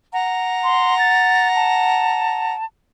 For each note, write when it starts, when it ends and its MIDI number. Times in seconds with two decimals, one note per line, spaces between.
0.13 2.55 78
0.13 2.55 82
0.64 0.97 84
0.99 1.48 93
1.55 2.65 81